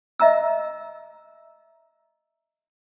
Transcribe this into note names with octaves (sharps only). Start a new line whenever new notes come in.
D#5 E5 A#5 E6